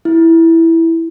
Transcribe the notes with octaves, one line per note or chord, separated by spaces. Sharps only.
E4